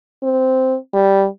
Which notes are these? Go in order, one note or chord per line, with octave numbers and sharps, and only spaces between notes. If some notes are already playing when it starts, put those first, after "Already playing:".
C4
G3